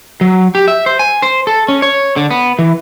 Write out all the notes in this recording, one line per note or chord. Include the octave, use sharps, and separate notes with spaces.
F#3
G4
E5
C5
G#5
C5
A4
C#4
C#5
D3
B3
E3